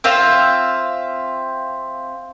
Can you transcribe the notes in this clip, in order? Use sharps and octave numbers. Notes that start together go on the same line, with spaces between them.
C4 F4 E5 F5